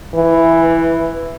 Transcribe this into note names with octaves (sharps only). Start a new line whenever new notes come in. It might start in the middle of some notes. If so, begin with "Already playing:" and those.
E3